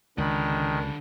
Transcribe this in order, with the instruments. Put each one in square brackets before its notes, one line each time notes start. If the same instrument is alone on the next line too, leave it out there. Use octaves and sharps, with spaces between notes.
[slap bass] C#2 [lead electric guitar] D3 B5 [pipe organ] D#3 [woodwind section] D4